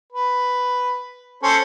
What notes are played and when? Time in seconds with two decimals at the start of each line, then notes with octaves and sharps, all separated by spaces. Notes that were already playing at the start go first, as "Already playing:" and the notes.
0.12 B4
1.43 C#4 A4 C5